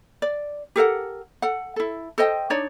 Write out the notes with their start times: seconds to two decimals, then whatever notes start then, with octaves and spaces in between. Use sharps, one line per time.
0.22 D5
0.76 G4 A4 A#4 F#5
1.42 A4 F#5
1.76 E4 A4
2.18 A4 C5 D#5 G5
2.50 D4 D#4 C#5 D5